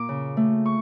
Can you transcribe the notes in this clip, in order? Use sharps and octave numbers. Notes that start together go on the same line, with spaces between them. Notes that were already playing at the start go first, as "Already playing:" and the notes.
Already playing: A#2 A#3 D6
C#3
A3
C#6